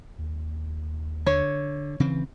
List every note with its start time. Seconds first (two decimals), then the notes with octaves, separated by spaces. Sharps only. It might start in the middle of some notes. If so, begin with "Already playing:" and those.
0.19 D#2
1.26 D3 C#5
2.00 C#3 E3 C4